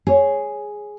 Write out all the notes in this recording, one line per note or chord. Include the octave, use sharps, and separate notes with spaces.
G#4 C#5